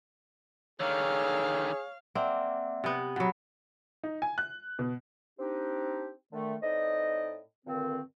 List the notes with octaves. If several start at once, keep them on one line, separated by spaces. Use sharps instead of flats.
D3 D#3 G#4 C#5 F5
A#3 C4 D5 E5 F#5
C3 B3
B2 F#3 F#5 B5
D#4
G#5
F#6
B2
C4 D4 D#4 G4
D3 D#3 A3
A2 C4 D#4 D5 D#5
G2 A#2 D3 D#3 C4